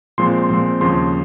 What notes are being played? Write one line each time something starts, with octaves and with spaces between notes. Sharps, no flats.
A#2 F3 G#3 C4 C6
C6
A#2 F3 G#3 C4 C6
D#2 C#3 F3 C6